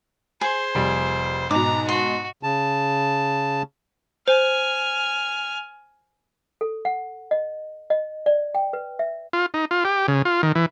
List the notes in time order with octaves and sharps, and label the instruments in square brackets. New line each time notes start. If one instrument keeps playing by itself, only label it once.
[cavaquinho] G#4 G#5 [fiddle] C5
[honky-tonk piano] F1 G3
[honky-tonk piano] G#2 B2 [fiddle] A#5 [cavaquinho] D6
[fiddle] F#4 [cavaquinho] C6
[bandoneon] C#3 A5
[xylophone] C5 [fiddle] G#5 F6
[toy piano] A4
F#5
D#5
D#5
D5
G5
B4
E5
[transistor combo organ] F4
D#4
F4
G4
C#3
F4
D#3
E3